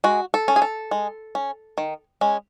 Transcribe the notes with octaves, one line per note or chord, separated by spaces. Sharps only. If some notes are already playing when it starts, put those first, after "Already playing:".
G#3 F#4
A4
C#4
G#4
A4
G#3
C#4
D#3
G#3 C#4